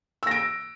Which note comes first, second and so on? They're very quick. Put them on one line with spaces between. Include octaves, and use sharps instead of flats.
E6 A#6 D7